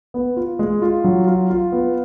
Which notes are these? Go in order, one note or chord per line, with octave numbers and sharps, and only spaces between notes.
B3
F4
G#3
F4
F#3
F4
F4
B3